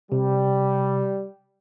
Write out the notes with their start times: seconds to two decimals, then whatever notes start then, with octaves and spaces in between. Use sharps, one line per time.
0.12 C3 G3